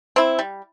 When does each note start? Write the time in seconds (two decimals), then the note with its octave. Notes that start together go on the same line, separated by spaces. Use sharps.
0.16 C4 E4
0.39 G3